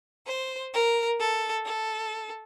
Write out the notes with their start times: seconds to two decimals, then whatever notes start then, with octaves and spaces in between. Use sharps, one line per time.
0.26 C5
0.73 A#4
1.19 A4
1.64 A4